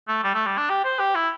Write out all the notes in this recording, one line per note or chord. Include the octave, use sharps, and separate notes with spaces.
A3
G3
A3
G3
D4
G4
C5
G4
E4